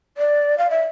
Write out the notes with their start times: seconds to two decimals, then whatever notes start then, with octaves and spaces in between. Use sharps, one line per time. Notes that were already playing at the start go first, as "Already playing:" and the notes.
0.18 D5
0.58 F5
0.70 E5